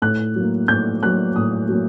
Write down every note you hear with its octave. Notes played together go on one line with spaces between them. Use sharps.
A2 F#6
F#3
A#3
A2 G6
F#3 A#3 F#6
A2 D#6
F#3 A#3